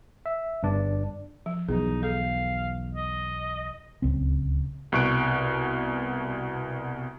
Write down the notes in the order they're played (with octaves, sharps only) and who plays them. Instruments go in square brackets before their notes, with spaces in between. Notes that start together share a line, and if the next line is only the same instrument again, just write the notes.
[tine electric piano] E5
G1 G2 D4 D5
[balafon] F3
[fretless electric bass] B1 E2 [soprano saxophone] D#4 [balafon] G#4
[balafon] A4 [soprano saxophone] F5
[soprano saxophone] D#5
[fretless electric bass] D1 C#2 C4
[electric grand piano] C2 B2 C#6 F#6 D7